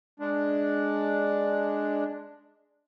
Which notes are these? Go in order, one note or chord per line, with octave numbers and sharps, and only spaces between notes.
G#3 D4